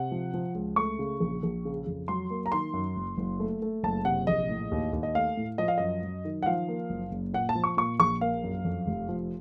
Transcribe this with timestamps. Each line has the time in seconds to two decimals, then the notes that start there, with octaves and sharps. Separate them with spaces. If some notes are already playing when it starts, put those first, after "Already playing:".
Already playing: C3 F#5
0.12 F3
0.34 F3
0.55 C#2
0.76 A3 C#6
0.99 C#3
1.20 A#1
1.43 A#1
1.65 C#3
1.87 F2
2.08 F#3 C6
2.30 A#3
2.46 A#5
2.52 D#3 C6
2.73 F#2
2.96 F#1
3.18 F#1
3.40 A3
3.62 A3
3.83 F#1 A5
4.05 C3 F#5
4.27 A#1 D#5
4.49 A2
4.71 D#2
4.93 D#2
5.03 D#5
5.15 A3 F5
5.37 A2
5.58 F3 D#5
5.68 F5
5.78 F#2 D#5
6.03 F#3
6.25 D#3
6.43 F#5
6.46 F3 F5
6.68 A#3
6.90 F#1
7.11 F#1
7.33 A#2 F#5
7.49 A5
7.55 F3
7.64 C#6
7.77 A#2 C#6
8.00 A#1 C#6
8.21 A#3 F5
8.43 F#2
8.65 F2
8.87 F1
9.09 F3